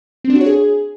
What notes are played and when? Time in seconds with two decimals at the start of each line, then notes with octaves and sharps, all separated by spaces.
0.24 C4
0.30 D4
0.35 F#4
0.41 C#5
0.46 G#4